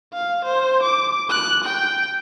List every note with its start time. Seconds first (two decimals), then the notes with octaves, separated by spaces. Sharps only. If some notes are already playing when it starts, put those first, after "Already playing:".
0.14 F5
0.45 C5
0.83 D6
1.30 F#6
1.64 G5